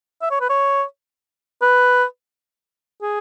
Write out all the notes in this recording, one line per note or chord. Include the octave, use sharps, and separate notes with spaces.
E5
C#5
B4
C#5
B4
G#4